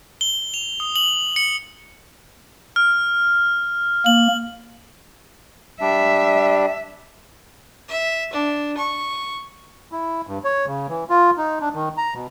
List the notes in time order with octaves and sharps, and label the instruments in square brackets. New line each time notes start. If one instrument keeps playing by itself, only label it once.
[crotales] G7
F7
D#6
F#7
C#7
F6
[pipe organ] A#3 [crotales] F#7
[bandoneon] G3 D4 [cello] E5
[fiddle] E5
D4
C#6
[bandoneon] E4
G2
C#5
C#3
E3
F4
D#4
D4
D#3
A#5
B2